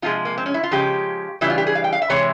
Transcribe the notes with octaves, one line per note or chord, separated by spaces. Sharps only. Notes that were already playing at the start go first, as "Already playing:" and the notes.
C3 F3 G#3 F4
A#3
C4
C#4
E4
F4
C#3 F3 G#3 G4
C#3 E3 G3 E4
F4
G4
G#4
F5
G5
F5
E5
C3 E3 G#3 C#5